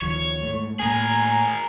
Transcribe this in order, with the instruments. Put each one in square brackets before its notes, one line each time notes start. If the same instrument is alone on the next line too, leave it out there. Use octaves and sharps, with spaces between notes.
[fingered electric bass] D2 D#3 F3 [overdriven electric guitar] C#5
[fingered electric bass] G#2 A3
[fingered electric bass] A2 A3 A#3 [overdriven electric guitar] G#4 A#4 [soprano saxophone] G#5